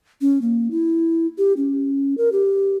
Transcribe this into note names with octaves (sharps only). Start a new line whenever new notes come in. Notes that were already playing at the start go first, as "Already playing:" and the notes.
C#4
A#3
E4
G4
C#4
A#4
G4